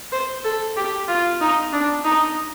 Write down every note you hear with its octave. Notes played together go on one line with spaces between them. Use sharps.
C5
A4
G4
F4
D#4
D4
D#4